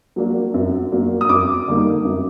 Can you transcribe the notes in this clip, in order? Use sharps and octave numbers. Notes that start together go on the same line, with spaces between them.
F#3 A#3 D4
F#2
F#3 A#3 D4
D#6
F#2 D6
D3 G3 A#3 D#4
F#2